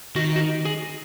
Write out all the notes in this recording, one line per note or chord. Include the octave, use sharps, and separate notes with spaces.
D#3 F#4
F#4
D#4
G#4